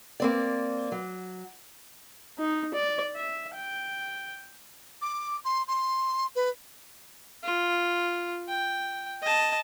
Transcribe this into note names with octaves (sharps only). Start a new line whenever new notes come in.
A#3 C4 D5
F#3
D#4
D5
E5
G5
D6
C6
C6
B4
F4
G5
D#5 A5